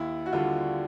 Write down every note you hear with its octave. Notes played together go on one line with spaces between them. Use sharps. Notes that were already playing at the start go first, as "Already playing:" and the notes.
Already playing: D#2 E4
F#4
D3 G3 F4